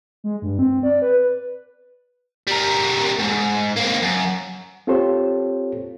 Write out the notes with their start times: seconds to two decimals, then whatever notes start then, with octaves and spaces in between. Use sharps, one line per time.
0.24 G#3
0.42 G2
0.59 C4
0.83 D5
1.02 B4
2.47 G3 A#4
3.19 D2 G#2
3.77 A#3 C4
4.03 F#2
4.87 C4 F4 G4 A4 C5 C#5